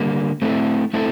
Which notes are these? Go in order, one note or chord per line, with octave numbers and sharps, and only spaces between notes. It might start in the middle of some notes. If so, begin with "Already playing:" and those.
Already playing: D3 G3 A#3
A3 C4 E4 A4
A3 C4 E4 A4